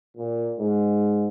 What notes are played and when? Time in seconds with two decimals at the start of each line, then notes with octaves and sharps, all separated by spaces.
0.17 A#2
0.59 G#2